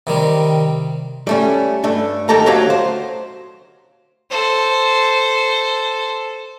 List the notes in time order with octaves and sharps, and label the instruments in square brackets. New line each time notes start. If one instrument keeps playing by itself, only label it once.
[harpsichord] C3 D#3 G3
[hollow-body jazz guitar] G3 A3 C#4
G2 A3 D4
D#2 D#3 G4 A4 A5 A#5
D2 F#3 G4 C#5 F5 F#5
C5
[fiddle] A4 C5